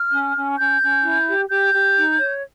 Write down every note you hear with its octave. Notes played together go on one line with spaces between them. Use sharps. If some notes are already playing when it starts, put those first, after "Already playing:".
Already playing: F6
C#4
C#4
C#4 G6
C#4
E4
G4
G4 G6
G4
D#4
C#5